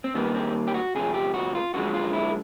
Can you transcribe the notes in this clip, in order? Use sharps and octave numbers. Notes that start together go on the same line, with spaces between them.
C4
D#2 D#3 G3 A#3 B3
C4
G4
F#4
D2 C3 F3 G#4
G4
F#4
F4
F#2 D3 F3 G#3 F#4
F4
E4